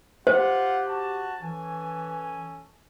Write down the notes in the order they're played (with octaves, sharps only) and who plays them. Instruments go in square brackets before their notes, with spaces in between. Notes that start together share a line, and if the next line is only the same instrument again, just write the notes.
[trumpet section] F4 F#5 [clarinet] G4 [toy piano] C5
[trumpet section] F#4 A5
[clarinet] E3 [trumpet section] C#4 A4 G#5